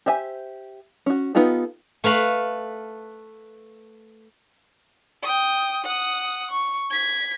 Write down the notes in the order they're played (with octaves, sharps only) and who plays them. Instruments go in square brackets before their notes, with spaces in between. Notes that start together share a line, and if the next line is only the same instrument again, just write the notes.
[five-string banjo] G4 C5 E5 G#5
C#4 F#4
B3 D#4 F4 G4 A4
[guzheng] A3 B4 F5 B5
[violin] G5 D#6
F#5 D#6
C#6
G#6 B6